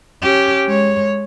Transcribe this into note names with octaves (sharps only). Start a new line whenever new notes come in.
C#4 G4
G#3 C#5